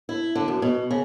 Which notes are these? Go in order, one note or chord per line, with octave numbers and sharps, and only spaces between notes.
E4
D3
F#2
B2
C#3